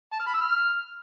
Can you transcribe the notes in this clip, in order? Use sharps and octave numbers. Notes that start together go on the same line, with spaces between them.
A5
F6
B5
E6
F6